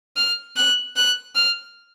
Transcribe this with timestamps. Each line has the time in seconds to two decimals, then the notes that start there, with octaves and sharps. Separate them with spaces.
0.17 F6
0.56 F#6
0.96 F#6
1.36 F6